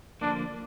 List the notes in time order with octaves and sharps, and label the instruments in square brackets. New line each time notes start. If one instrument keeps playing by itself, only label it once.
[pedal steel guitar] D3 F3 A#3 [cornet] D4